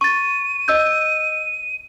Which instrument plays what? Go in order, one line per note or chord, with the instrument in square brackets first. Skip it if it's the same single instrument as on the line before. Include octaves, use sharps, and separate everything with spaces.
[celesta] C#6 A6 [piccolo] D#7
[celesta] D#5 E6 G6